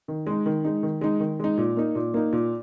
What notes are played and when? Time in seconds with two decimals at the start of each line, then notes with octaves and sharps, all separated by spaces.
0.08 D#3
0.27 G#3 D#4
0.46 D#3
0.65 G#3 D#4
0.83 D#3
1.01 G#3 D#4
1.20 D#3
1.40 G#3 D#4
1.58 A#2
1.77 A#3 D#4
1.95 A#2
2.14 A#3 D#4
2.33 A#2